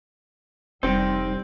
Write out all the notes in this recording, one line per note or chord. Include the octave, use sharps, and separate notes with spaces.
F1 G3 C4 D#4 G5